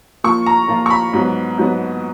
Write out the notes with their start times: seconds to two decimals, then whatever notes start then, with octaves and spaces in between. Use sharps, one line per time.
0.24 A#2 F3 A#3 F4 C#6
0.46 A#5
0.68 A#2 F3 A#3 F4
0.86 C#6
0.90 B5
1.13 G#2 F#3 B3
1.58 G#2 F#3 B3